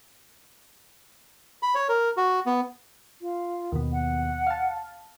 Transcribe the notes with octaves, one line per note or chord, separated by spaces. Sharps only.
B5
C#5
A#4
F#4
B3
F4
D#2 B2
F#5
F5 A5